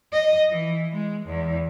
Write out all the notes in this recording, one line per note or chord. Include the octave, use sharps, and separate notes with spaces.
D#5
E3
G#3
E2